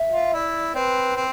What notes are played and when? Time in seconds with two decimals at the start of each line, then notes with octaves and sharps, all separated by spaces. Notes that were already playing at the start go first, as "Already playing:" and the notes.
Already playing: E5
0.13 F4
0.33 E4 D5
0.75 C4 B4
1.16 C4 B4